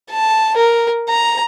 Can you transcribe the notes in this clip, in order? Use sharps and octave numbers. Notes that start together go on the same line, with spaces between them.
A5
A#4
A#5